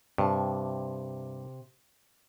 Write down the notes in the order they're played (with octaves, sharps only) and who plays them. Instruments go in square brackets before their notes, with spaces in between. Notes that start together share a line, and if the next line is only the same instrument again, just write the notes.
[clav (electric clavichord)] G2 [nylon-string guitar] C3 E5 A5